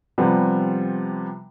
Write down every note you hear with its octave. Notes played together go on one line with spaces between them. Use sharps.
C3 F3 G3 B3